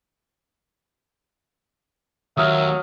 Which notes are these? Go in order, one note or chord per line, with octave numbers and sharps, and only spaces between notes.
D#2 F#3 E5 D#6 F6